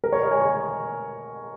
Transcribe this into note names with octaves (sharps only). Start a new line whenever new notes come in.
A#4
C#5
D#5
G#5
C#6